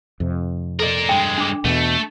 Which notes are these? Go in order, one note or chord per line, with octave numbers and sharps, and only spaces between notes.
F2 C3
A4 A#4 D5 D#5
G2 G#3 G5
D4 D6
E2 B2 A3